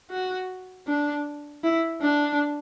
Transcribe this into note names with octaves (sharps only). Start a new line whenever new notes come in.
F#4
D4
E4
D4